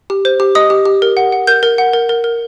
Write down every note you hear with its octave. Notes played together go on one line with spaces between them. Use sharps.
G4
C5
G4
D#5 D#6
G4
G4
A#4
F#5
F#5
A#4 G6
A#4
F#5
A#4
A#4
A#4